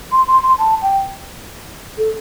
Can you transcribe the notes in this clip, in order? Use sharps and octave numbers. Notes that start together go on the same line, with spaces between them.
C6
C6
C6
A5
G5
A4